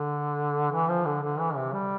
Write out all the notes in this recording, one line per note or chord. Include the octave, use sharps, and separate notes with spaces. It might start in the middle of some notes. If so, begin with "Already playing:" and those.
Already playing: D3
E3
F3
D3
D3
E3
C3
G3